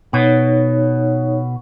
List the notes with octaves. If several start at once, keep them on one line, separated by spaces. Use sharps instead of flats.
B2 D#4 C#5